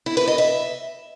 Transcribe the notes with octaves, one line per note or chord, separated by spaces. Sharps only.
E4
B4
D#5
E5